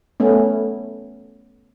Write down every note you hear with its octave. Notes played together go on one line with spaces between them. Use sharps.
A3 B3 C#4